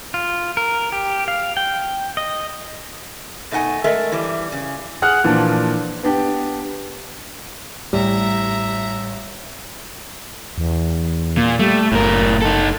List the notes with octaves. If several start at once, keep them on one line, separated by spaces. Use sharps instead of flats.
F4
A#4
G4
F5
G5
D#5
B2 A3 D#4 F#5 G#5
G#3 A3 A4 A#4 E5
E3 G3
C#3
G#4 F#5 F6 F#6
A#2 E3 F3 D4
B3 D4 G4
A1 G3 E5 A#5
E2
A#2
G3 A3
F#1 A2 A#4
D#4 A4